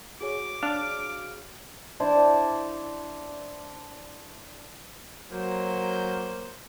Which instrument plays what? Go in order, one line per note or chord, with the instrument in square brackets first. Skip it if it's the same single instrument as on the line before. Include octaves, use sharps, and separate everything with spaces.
[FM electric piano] F#4 G#4 C#5 [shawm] D6
[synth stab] D4 [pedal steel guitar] F5
[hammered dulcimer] D4 E4 C5 D5
[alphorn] F#3 [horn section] A#3 C5